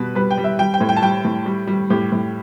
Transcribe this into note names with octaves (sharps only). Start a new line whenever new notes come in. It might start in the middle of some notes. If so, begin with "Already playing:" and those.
Already playing: B2 G3 B4
G3 B4
G5
G3
E5
G3 G5
G5
A2
G5
A5
G3 G5
A2
G3
G3
A2 G4
A2